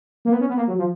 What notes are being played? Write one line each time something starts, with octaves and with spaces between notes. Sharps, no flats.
A#3
B3
C#4
B3
A#3
F#3
F3